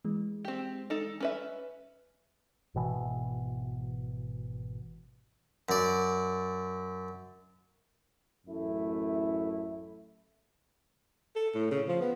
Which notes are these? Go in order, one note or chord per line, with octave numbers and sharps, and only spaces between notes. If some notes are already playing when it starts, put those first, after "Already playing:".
E3 G#3
C4 G4
D#4 A4
C#4 B4 E5
G#1 B2 E3
F#2 D5
A1 F#2 A3 E4
A4
A2
C#3
F3
B3